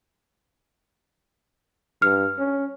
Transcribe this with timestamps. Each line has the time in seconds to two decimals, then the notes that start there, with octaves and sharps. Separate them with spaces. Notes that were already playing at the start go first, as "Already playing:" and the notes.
2.02 G2 F6
2.38 C#4